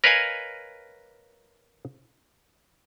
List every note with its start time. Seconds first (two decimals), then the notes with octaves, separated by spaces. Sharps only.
0.04 A#4 B4 C#5 D#5 F5 G#5